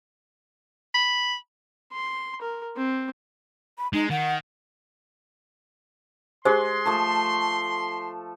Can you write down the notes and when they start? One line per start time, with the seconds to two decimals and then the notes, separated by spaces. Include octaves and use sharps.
0.94 B5
1.92 C6
2.41 A#4
2.77 C4
3.78 B5
3.93 G#3 D#4
4.10 D#3 F#5
6.45 G#3 G4 G#4 C5 C6
6.85 F3 A3 A4